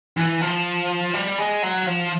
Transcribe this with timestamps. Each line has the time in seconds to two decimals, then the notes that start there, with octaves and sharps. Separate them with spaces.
0.17 E3
0.41 F3
1.13 G3
1.38 G#3
1.62 F#3
1.86 F3